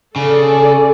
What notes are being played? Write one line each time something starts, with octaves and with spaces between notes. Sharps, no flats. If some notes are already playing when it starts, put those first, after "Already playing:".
C#3 A4 D5